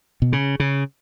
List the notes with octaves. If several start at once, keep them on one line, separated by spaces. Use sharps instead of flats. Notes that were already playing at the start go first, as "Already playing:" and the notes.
B2
C#3
C#3